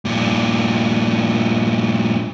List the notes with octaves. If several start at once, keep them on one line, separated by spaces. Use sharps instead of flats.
G2 A#2